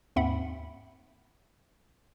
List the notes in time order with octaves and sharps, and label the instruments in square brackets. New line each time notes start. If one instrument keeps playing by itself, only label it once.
[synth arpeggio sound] D#2 G#2 C4 E5 F#5 B5